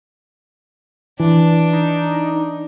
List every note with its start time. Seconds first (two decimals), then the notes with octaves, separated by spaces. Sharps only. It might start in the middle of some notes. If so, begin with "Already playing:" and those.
1.20 E3 D4
1.73 D#4